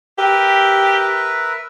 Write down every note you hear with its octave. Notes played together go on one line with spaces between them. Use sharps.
G4 A#4 B4 E5